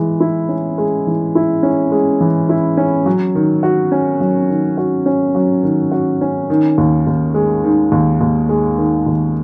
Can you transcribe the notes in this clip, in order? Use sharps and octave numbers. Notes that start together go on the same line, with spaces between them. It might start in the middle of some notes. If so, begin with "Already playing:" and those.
Already playing: E3 G#3
E4
C#4
G#3
E3
E4
C#4
G#3
E3
E4
C#4
F#3
D#3
F#4
C#4
F#3
D#3
F#4
C#4
F#3
D#3
F#4
C#4
D#3
D#2
D#2
G#3
D#3
D#2
D#2
G#3
D#3
D#2